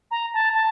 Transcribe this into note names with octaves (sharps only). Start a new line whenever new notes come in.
A#5
A5
A5